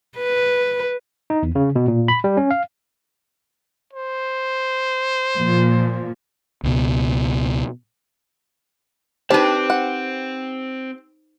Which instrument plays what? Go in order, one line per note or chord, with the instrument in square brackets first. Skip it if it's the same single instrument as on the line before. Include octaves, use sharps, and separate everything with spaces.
[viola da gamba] B4
[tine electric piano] D#4
E2
C#3
B2
A#2
B5
G3
C#4
F5
[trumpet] C5
[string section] A#2 F3
[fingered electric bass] C#2 B2
[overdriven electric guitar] C4 [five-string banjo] D4 [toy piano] D#4 C5 [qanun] G4 B4
[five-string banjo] F#5